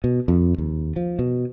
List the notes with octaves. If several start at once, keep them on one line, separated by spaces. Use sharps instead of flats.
B2
F2
D#2
F3
B2